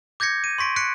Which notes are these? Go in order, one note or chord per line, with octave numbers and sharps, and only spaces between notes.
D6 G6 G#6 A#6 C#7
D#7
C6 C#6 B6 D7
F#6 B6 C#7 D7